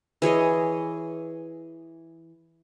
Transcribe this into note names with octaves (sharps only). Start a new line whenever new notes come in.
E3 G#4 C#5 D#5